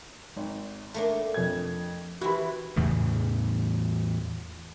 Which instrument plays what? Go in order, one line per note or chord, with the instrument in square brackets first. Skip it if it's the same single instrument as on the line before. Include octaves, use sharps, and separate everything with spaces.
[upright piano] G#1
[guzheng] A3 A#3 D4
[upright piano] F2 G#6
[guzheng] E3 E4 [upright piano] F#4 G4 B5
[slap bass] E2 A2 C#3 E3